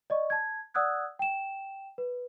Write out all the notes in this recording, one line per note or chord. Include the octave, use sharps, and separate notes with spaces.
D5 D#5 C#6
A5 G#6
D5 F#5 D#6 E6 F#6 G#6
G5 E7
B4